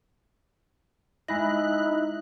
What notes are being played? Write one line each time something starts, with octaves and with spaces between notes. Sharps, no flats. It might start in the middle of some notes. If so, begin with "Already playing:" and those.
G#3 D#4 E4 B5 F#6 A#6